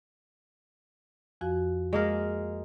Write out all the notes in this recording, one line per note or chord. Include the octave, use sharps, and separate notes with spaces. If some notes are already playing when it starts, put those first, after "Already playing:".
F2 F3 F#4
G#3 A#3 A#4